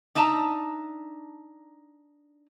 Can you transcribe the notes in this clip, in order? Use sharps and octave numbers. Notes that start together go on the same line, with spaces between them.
D4 D#4 E5 A5 A#5